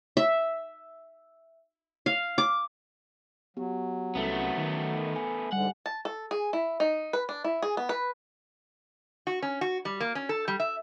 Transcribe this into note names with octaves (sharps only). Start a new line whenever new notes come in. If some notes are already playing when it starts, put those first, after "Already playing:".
E5
F5
D6
F#3 B3 G4
C2 A3 B3 C#4 A4
D#3
G#5
G#2 D3 G3 F#5
A5
A4
G#4
E4
D#4
B4
D4
E4
G#4
B3
B4
F#4
C#4
F#4
G3
A#3
C#4
A4
G3
E5